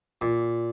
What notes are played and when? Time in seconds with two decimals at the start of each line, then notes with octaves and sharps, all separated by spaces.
0.21 A#2